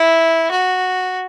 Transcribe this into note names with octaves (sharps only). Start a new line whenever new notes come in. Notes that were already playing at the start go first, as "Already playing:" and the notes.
Already playing: E4
F#4